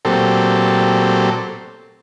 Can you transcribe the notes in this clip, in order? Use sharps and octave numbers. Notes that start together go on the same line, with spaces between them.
A#2 F#3 A3 C4 G4 A4